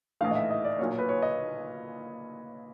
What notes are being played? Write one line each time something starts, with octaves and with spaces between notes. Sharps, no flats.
A#1 A2 E3 A3 F5
D#5
E5
D#5
D5
B1 A#2 F#3 A#3 C#5
C#5
B4
C#5
D#5